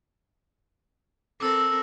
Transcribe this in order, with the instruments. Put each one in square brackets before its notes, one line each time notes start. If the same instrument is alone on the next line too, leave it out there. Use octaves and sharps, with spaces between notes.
[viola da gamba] C4 A4 A#4 [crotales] D6 E6